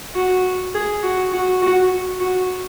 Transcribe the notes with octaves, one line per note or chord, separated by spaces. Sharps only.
F#4
G#4
F#4
F#4
F#4
F#4